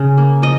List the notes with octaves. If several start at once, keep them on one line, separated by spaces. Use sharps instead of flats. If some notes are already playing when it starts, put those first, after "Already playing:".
Already playing: C#3
A#3
F3 D#5